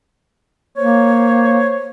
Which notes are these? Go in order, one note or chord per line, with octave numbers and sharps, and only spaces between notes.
A#3 C5 C#5